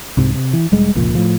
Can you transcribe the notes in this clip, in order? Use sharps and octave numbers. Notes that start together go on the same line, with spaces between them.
C2 G#2 C3
C3
E3
E1 G3 G#3
F1 C#2 A#2 F3
A2 F3